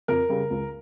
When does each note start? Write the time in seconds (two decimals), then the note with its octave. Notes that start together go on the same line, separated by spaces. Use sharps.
0.08 F2 A#4
0.29 C#3 G3
0.50 C#2